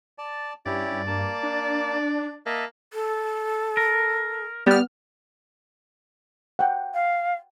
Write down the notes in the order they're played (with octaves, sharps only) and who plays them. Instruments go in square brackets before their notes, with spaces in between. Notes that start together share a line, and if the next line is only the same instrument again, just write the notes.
[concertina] D5 A5
[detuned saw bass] G2 [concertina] C#4 E4 G4 [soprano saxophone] D5
[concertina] A#3 A5
[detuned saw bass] D4
[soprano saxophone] A#3 [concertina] D#5 E5 A5
[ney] A4
[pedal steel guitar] A#4
[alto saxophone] G3 [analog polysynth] B3 F6
[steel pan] F#5 G5
[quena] F5